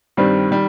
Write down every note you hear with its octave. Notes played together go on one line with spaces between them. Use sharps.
G2 D#3 G3 C4
D#3 G3